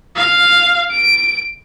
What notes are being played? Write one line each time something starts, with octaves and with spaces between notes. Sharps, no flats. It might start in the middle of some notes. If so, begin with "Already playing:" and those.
F5
D7